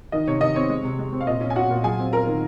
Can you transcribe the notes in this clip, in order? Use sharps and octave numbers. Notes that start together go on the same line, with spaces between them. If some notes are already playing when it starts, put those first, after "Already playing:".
D#3 D#5
C3 C#5
D#3 D#5
C4 C#5
G#3
C3
G#3
C4
F5
A#2 D#5
C#4
G#5
C#4 F#4 F#5
A#2
F#3 G#4 G#5
C4
F4 A#4 A#5
D#3